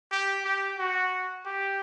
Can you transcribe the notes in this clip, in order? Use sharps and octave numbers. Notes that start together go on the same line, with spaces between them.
G4
G4
F#4
G4